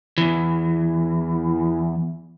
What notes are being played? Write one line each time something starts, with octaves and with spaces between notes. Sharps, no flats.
E2 E3